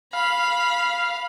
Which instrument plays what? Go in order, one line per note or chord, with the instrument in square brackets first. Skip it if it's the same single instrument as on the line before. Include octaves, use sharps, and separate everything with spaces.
[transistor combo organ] F5 [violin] B5